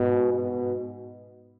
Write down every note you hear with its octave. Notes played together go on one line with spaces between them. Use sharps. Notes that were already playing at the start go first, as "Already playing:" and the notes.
Already playing: G#2 B2
B2